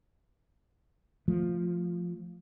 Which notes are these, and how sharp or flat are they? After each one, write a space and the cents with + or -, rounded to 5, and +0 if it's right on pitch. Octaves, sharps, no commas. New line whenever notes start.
F3 +0 A3 +0